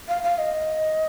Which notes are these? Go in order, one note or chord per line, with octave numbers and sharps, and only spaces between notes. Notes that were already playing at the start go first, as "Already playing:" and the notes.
F5
F5
D#5